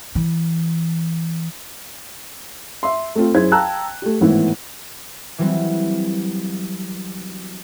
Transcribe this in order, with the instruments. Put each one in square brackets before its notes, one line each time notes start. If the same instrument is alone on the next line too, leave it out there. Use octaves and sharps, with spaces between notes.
[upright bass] E3
[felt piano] E5 C6
A3 C4 F4
F#2 E4 G#4 C5 G#6
F5 G5 A5 A#5 E6 F#6
A3 G4
G#1 A2 E3 B3 E4
[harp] E3 F#3 G3 C4